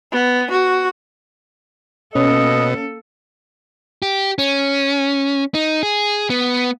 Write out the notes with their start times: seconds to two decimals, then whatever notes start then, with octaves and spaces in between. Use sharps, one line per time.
0.12 B3
0.51 F#4
2.15 B2 A#3 C#4 A4 D#5
4.02 G4
4.38 C#4
5.54 D#4
5.83 G#4
6.30 B3